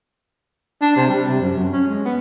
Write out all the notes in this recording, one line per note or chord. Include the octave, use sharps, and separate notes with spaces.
D4
C3
G3
C3
F#2
F#2
C#4
G#3
B3